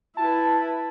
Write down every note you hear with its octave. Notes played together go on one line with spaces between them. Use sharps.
E4 B4 A5